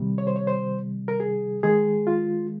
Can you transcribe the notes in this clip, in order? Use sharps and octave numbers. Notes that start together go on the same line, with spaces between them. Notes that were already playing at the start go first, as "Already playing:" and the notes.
Already playing: C3 D#3 G3
C#5
C5
C#5
C5
A#4
G#4
D#3 G#3 G#4
F4